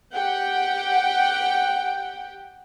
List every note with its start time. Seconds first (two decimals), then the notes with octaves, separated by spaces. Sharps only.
0.14 G4 F#5 G5